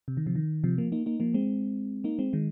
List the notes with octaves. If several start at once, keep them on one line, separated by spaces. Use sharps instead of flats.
C3
D#3
C3 F3
D#3
C3 F3
F3 A#3
A#3 D#4
A#3 D#4
F3 A#3
G#3 C4
A#3 D#4
G#3 C4
D#3 G#3